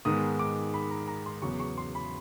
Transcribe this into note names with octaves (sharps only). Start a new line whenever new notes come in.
G#2 D#3 G#3 B3 D#6
D6
B5
A#5
A#5
C6
E2 C#3 F#3 B3 C#6
C#6
C6
B5